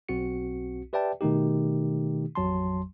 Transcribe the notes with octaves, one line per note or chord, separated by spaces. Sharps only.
B1 C4 F#4 C#7
G4 B4 D5 E5 G5 A5
B2 D#3 A3 D#4 G4
A1 F2 F#3 A5 C6